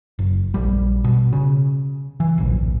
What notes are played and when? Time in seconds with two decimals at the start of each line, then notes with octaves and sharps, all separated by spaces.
0.19 F#1
0.54 A#1 G3
1.04 B2
1.33 C#3
2.20 E3
2.38 D1 A#1